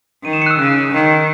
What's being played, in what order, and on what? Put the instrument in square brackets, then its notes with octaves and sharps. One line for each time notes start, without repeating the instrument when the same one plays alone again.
[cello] D#3 [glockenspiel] D#7
[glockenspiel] E7
C#7
F#6
E6
[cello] C#3 [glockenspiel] F#6
[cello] D#3